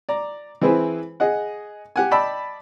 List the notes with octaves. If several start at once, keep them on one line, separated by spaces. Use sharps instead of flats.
D5 A#5
E3 C4 E4 G#4 B4 C5
G#4 D#5 F#5
G4 F#5 G#5
D5 D#5 G5 A5 B5 E6